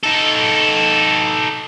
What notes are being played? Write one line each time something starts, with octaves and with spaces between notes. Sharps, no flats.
D#4 A4